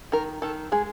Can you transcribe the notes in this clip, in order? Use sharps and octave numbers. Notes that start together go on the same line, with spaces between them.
D#3 A#4
D#3 A4
G#3 G#4